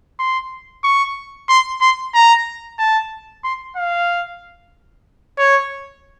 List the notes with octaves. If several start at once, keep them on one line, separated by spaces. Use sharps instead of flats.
C6
C#6
C6
C6
A#5
A5
C6
F5
C#5